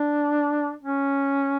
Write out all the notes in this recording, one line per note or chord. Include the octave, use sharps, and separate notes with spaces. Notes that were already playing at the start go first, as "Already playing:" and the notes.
Already playing: D4
C#4